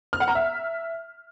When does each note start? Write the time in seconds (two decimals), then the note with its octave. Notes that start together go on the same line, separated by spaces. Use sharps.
0.13 F6
0.20 F#5
0.28 A#5
0.35 E5